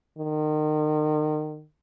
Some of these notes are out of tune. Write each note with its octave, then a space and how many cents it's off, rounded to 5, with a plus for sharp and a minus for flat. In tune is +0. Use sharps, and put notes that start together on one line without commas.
D#3 -30